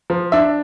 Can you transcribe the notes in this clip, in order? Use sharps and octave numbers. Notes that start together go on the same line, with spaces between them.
F3
D4 E5